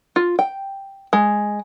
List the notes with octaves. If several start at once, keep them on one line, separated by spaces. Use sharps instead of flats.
F4
G5
G#3